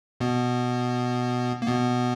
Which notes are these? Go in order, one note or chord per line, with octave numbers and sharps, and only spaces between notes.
B2 B3
A#3
B2 B3